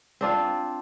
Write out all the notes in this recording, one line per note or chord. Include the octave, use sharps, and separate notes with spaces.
C4 D4 F4